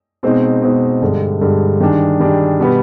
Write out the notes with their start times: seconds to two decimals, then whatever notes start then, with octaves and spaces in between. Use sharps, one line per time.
0.23 B2 G#3 C4 D#4
0.62 B2 G#3 C4 D#4
1.02 G2 D3 G#3
1.41 G2 D3 G#3
1.80 D#3 G3 D4 G#4
2.20 D#3 G3 D4 G#4
2.59 B2 G3 B3